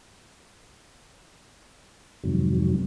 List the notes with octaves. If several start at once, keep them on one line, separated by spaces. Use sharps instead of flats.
F2 G#2 C3 D#3 F#3